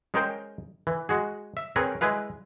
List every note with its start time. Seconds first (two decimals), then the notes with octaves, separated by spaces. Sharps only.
0.14 G#3 C#4 G#4 A#4 C5 G5
0.87 E3
1.09 G#3 F#4 G#4
1.57 E5
1.76 C4 G#4 A#4 B4 C#5
2.01 G#3 E4 G#4 B4 F5